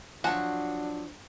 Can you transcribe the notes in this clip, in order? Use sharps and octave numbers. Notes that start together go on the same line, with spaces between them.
F3 F#3 D4 F#4 G#5 A5